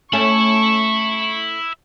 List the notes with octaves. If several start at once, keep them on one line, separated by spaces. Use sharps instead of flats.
A3 C#4 E5 B5 C#6